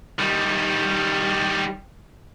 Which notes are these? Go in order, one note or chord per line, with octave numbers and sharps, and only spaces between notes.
D#3 G3